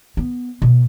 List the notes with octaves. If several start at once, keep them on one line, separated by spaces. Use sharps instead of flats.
B3
B2